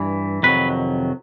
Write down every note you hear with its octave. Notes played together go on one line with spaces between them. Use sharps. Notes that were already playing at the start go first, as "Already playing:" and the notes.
Already playing: G2 E3
F2 C3 D#3 F#3 B4